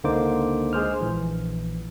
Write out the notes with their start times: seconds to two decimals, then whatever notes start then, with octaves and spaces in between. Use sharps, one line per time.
0.04 C#2 D3 A#3 D#4 C5 D6
0.73 G#3 G#4 C5 F6
1.01 A#1 E3